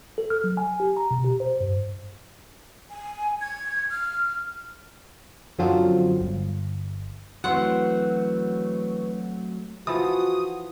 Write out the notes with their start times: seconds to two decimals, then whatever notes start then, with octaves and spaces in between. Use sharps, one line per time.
0.18 A4
0.30 F6
0.44 F#3
0.57 G#5
0.80 G4
0.97 A#5
1.11 B2
1.24 G4
1.40 C5
1.61 G2
2.90 G#5
3.41 G#6
3.91 F6
5.59 F#2 D3 F3 F#3 C4 F4
6.21 G1
7.44 E3 F#3 A3 C4 F#4 F#5 C6
9.87 E3 F3 F#4 D#6